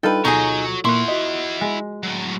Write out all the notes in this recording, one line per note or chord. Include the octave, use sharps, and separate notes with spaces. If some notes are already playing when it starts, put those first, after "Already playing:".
G3 D4 D#4 F4 A4 B4 G5
D2 B2 F#3 D#4 G#4 C#5 G#5 C#6
A#2 A#3 E4 F#5 C6 C#6
F#4 D#5
G#3
A2 F#3